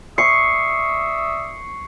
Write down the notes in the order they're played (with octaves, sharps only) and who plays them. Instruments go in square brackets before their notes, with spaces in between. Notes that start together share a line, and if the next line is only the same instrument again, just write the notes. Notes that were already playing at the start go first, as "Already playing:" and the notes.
[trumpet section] D5 E5 D#6 [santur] C#6 [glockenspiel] C7 C#7